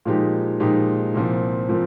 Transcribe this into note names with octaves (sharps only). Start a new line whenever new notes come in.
A#2 F3 G#3 D#4 G4
A#2 F3 G#3 D#4 G4
C2 A#2 F3 C4
A#2 F3 C4